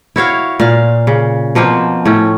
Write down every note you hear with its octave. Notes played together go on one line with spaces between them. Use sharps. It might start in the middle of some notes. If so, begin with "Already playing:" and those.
E4 F#4 C#5 F5
A#2 F5
C#3
B2 F3 A#3 C4
A2 C#4